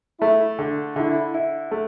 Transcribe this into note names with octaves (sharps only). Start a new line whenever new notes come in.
A3 E4
D3
D3 E4
E4
A3